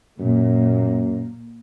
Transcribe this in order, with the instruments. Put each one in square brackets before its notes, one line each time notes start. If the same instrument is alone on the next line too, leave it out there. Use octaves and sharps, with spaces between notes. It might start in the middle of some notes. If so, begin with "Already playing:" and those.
[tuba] F#2 [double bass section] A#2 A#3